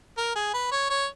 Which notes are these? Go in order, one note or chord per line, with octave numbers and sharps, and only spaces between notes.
A#4
G#4
B4
C#5
C#5